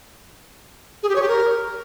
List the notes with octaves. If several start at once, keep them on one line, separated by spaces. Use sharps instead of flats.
G#4
G4
C#5
G4
A#4